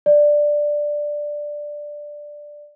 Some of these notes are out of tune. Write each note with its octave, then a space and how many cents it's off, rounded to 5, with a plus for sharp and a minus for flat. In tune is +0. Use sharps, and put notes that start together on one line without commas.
D5 +5